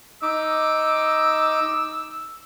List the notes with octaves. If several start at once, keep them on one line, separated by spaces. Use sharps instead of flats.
D#4 D6 E6